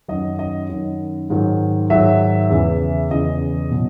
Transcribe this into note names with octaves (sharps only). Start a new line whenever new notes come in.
F#2 D#3 F#3 D#5
D#5
F#2 D#3 F#3
G#2 D#3 F#3
G#2 D#3 F#3 E5
E2 C#3 E3
E2 C#3 E3 D#5
B2 F#3